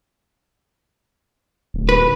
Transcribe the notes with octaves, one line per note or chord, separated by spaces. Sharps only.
D1
B4